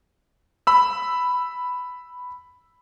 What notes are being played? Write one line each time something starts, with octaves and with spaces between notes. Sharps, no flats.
B5 E6